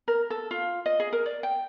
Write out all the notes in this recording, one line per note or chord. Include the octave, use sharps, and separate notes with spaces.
A#4
A4
F4
D#5
G#4
A#4
D5
G5